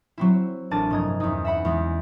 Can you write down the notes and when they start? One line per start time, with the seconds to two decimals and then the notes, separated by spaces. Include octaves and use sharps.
0.18 F#3 C4 E4
0.71 A1 D4 A#4 A5 A6 D#7
0.90 F1 G2 D#5 A#5 G#6
1.20 E2 C#4 D#4
1.45 E5 F#5 B5
1.64 E2 E3 G#3